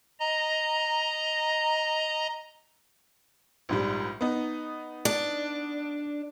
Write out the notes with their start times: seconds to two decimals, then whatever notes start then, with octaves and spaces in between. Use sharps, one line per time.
0.19 D#5 A#5
3.69 A#1 G#2 G3
4.21 B3 D#4
5.05 D4